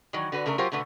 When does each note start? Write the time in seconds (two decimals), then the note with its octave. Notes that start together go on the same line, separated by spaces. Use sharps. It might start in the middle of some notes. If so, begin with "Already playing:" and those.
0.13 D#3 E3 F#3
0.32 D3 F#4 B4
0.46 C#3 A3 D4 A#4
0.58 F#3 F4 G4 A#4 C5
0.72 B2 D3 A3 B3